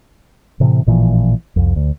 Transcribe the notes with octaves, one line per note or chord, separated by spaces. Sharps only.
A2 C3 E3
A1 A#2 E3 F3
C2 F2
D2